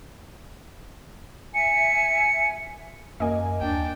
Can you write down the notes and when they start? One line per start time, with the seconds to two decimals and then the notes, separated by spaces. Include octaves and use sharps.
1.54 E5 G#5 C#7
3.20 F#2 A#3 D#5 G#5
3.62 D#2 D4 G5